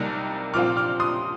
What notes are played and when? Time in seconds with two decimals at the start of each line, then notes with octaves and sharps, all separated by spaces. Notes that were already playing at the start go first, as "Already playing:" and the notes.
Already playing: C2 C3 G3 A#3 D#4
0.54 A#2 F3 C4 F4 D6 F6
0.77 D6 F6
1.00 C6 D#6